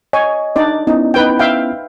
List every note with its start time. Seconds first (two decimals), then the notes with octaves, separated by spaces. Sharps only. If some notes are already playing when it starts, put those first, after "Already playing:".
0.13 C#5 D#5 G#5
0.56 D4 D#4 D5
0.87 B3 C#4 D#4 E4
1.14 D#4 B4 G5
1.39 E5 F5 G5